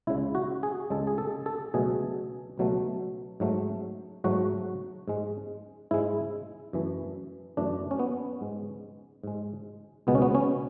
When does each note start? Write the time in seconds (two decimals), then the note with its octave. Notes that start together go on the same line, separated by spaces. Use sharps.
0.07 C#2 C#3 G#3 E4
0.35 F#4
0.63 G#4
0.90 C#2 C#3 G#3 A4
1.07 G#4
1.18 A4
1.46 A4
1.74 C#2 B2 F#3 A3 G#4
2.58 C#2 B2 F#3 A3
3.40 G#2 F#3 A3
4.24 G#2 F#3 A3 F#4
5.08 G#2 G#3
5.91 G#2 G#3 E4
6.73 F#2 E3 A3
7.57 F#2 E3 A3 D4
7.91 C#4
8.00 B3
8.41 G#2 G#3
9.24 G#2 G#3
10.07 C#2 B2 G#3 B3
10.15 C#4
10.22 B3
10.35 C#4